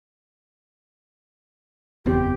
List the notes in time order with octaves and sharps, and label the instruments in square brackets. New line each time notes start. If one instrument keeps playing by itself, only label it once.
[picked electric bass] F#1 E2 C4 [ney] G4